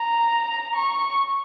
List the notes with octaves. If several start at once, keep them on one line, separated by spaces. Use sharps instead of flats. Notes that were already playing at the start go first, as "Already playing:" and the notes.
Already playing: A#5
C#6